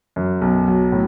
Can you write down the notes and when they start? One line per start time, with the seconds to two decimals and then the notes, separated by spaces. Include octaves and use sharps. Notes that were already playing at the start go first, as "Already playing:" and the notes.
0.16 F#2
0.41 B1
0.67 F#3
0.92 A2